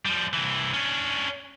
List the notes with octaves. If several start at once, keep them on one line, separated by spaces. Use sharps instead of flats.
F3 G3
C2 E3
C#4 D4